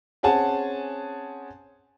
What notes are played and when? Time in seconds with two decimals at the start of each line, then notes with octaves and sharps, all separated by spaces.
0.23 C4 C#4 G#4 F#5 G#5 A5